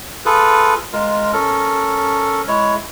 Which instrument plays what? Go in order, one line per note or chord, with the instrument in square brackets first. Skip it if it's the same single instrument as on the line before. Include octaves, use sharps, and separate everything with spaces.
[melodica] F4 G#4 A4 B4
G#3 F4 A#4
C#4 A4 A#4
G#3 E4 C#5